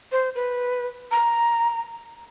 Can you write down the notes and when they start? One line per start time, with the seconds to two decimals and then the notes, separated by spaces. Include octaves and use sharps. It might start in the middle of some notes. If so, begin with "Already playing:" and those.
0.12 C5
0.35 B4
1.11 A#5